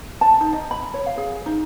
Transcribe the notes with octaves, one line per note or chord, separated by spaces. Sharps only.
A5
D#4
D#5
B5
C#5
F5
G#4
D#4